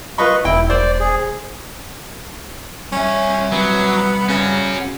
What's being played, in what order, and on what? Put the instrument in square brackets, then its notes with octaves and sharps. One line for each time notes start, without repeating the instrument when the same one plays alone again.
[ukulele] F4 B4 B5 [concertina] D#5 C#6
[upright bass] E1 [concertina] E4 [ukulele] G5
[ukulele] C5 [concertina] D5
[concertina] G#4
[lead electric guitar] G3 E5 [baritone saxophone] C#4
[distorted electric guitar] F#3 [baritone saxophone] B3
[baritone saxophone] C#3 [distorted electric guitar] C#4 F#4